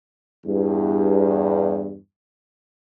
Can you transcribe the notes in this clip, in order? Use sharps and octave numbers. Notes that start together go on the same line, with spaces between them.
E2 G2